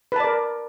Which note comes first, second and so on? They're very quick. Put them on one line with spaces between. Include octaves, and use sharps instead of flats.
B4 A5 D5 A#4